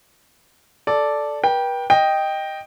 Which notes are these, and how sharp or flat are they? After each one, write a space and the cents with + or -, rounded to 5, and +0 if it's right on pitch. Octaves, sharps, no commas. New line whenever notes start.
A4 -5 D5 -5
B4 -40 G5 +0
D#5 +0 G5 +0